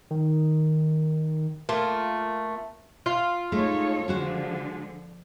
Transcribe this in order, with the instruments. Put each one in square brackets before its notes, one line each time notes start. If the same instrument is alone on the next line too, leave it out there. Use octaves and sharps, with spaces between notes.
[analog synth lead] D#3
[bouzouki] A3 A#3 F4
F4
[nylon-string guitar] G#3 A3 [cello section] D#4 A4 C#5
[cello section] D3 F3 [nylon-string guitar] G#3 F#4 C5